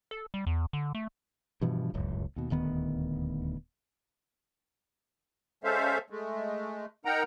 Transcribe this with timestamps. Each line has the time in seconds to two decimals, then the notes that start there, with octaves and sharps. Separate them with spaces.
0.11 A4
0.34 G3
0.47 E2
0.73 D3
0.95 A3
1.61 G2 B2 E3 F3
1.94 D1 G1 C#2 F#2
2.36 D#2 B2
2.50 D#1 D2 D#3 B3
5.64 G#3 C#4 A4 C5 E5 F5
6.10 G#3 A3
7.05 D#4 A#4 F#5 G5 A#5